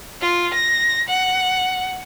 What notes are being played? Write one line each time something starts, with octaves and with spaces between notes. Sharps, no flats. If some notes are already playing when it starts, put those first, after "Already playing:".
F4
A#6
F#5